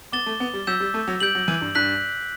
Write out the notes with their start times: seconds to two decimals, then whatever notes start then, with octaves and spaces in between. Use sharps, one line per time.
0.12 B3 D6 A6 E7 G7
0.26 A3
0.40 B3
0.54 G3
0.67 F#3 E6 G6 B6 E7
0.80 G3
0.94 A3
1.08 F#3
1.20 G3 G6 D7 F#7
1.35 F#3
1.48 E3
1.61 G2
1.75 G2 F#6 B6 F#7